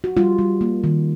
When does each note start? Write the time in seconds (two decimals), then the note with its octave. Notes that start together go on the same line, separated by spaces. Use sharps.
0.04 F#4
0.17 G3 F4
0.39 G3
0.61 A#3
0.84 D#3